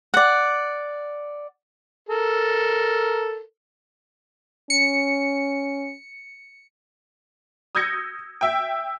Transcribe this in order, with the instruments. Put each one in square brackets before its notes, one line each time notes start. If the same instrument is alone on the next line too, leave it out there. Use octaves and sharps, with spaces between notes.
[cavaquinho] D5 F#5
[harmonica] A4 A#4
[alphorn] C#4 [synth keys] C#7
[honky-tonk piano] D#6 E6 G6 G#6 A#6 C#7
E5 G5